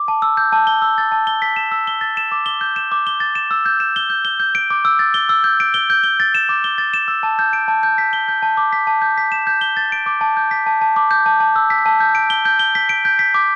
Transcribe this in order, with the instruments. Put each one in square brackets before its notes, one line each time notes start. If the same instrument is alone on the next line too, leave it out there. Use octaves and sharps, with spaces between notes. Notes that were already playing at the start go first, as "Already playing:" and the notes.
Already playing: [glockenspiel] D6
A5
E6
G6
A5
G7
E6
A6
A5
G7
B6
E7
E6
G7
A6
E7
D6
G7
G6
E7
D6
G7
A6
E7
E6
G6
E7
G7
G6
G7
G6
D7
D6
E6
A6
G7
E6
G6
D7
G7
G6
G7
A6
E7
D6
G7
A6
E7
E6
A5
G6
D7
A5
G6
B6
G7
G6
A5
D6
B6
A5
G6
B6
E7
G6
G7
A6
D7
D6
A5
G6
B6
A5
A5
D6
G6
A5
A5
E6
B6
A5
G6
D7
G7
G6
G7
B6
D7
G6
B6
D6